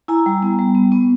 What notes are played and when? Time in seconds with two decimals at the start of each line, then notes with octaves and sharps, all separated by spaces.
0.08 E4 G#5 A#5
0.26 G3
0.43 B3
0.59 G3
0.75 B3
0.92 B3